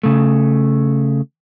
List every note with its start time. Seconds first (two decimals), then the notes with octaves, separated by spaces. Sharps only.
0.03 C#3 A3